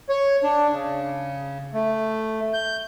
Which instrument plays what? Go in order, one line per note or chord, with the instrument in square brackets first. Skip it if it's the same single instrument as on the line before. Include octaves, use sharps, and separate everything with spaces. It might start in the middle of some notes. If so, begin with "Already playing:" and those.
[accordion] C#5
D4
C#3
A3
G6